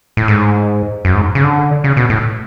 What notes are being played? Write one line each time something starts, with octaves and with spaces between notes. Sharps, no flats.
A2
G#2
F#2
G#2
C#3
D3
C#3
B2
A2